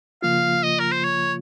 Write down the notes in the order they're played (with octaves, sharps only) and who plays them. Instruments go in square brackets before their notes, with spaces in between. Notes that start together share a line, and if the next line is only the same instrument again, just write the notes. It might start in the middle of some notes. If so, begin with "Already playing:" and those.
[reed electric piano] C#3 F3 A#3 F4 [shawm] F5
[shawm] D#5
A#4
C5
C#5